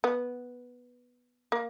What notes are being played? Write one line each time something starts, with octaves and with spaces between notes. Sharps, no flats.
B3
A#3